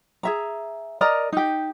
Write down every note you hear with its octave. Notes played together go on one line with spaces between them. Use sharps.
G#4 E5 A#5
A#4 D5 D#5 A#5
D#4 G4